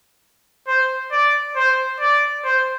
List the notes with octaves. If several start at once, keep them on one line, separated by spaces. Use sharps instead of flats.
C5
D5
C5
D5
C5